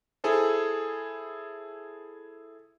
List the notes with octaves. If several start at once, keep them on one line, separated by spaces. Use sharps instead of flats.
E4 G#4 A4 C5